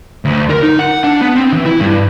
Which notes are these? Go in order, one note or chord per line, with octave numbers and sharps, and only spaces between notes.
D2
A#4
D#4
F#5
D4
B3
C4
E3
E4
G2